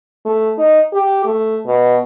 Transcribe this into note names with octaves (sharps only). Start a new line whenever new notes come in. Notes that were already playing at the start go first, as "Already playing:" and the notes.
A3
D#4
G4
A3
B2